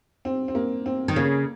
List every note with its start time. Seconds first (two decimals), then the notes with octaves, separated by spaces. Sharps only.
0.25 C4
0.48 C4
0.55 A#3
0.86 C4
1.08 D#3
1.16 C#3 A#3